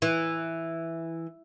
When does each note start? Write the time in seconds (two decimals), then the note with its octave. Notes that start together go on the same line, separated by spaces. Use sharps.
0.02 E3